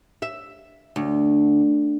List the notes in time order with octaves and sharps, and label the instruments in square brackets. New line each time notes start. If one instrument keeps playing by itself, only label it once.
[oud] E5
D2